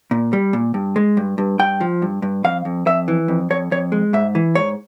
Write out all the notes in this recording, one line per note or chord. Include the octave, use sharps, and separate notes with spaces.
A#2
G3
A#2
G2
G#3
G2
G2
G2 G5
F3
G2
G2
F2 F5
F2
F2 E5
E3
F2
F2 C#5
F2 C#5
G#3
G#2 E5
E3
G#2 C#5